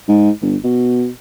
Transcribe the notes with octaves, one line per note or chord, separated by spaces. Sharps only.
G#2
G1
B2